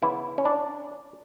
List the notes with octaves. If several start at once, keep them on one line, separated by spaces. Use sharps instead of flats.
C#3 E3 B3 E4
C#4
D4